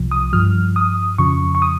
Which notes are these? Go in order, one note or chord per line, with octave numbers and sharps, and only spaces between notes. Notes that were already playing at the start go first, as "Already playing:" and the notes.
Already playing: C2 C3 F3
D#6
G2 F3 F6
D#6
F2 C#3 F3 C#6
C#6
D#6